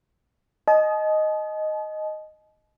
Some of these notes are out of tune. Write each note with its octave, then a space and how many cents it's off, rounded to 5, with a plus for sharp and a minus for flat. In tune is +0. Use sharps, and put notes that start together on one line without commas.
D#5 +0 A5 -45